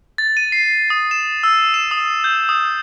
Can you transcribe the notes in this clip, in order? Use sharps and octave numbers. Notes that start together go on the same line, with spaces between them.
A6
D#7
C7
D#6
E7
E6
E7
D#6
G6
D#6